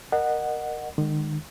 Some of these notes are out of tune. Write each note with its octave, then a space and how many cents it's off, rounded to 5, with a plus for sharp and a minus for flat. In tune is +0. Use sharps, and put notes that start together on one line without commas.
A#4 +0 D#5 -30 F#5 +0
D#3 -40 G#3 -15